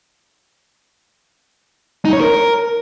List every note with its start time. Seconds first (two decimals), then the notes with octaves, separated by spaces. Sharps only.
2.05 D#4
2.13 C#5
2.21 A#4